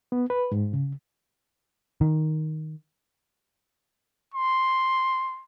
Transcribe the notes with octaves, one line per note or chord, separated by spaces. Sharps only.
B3
B4
G#2
C#3
D#3
C6